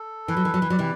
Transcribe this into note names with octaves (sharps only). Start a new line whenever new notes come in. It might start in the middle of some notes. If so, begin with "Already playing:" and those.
Already playing: A4
E3 B4
F#3
E3
F#3
E3
F#3 D5
C3 E3